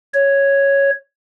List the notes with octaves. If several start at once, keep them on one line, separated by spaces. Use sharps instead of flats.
C#5